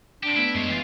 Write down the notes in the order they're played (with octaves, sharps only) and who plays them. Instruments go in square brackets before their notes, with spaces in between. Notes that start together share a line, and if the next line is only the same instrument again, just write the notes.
[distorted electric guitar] C4 G4 [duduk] D4 [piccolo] D7
[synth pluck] A3 B3 [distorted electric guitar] E4
[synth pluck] F#2 D7 [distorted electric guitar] E3 C#5 [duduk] G#3 [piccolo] C7
[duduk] E3 [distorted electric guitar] F4 G4